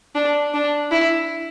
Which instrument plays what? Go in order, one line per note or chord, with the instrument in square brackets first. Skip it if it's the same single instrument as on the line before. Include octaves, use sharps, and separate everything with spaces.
[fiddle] D4
D4
E4